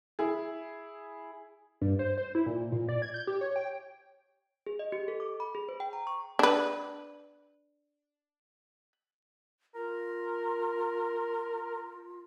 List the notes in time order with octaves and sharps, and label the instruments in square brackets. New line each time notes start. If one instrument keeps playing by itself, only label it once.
[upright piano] E4 G#4
[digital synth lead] G2
C5
C5
E4
A#2
A#2
D5
G#6
G6
G4
C#5
G5
[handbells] G#4
D#5
G4
A4
D6
B5
G#4
C5
G5
A#5
C#6
[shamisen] D4 B4
[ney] F4 [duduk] A#4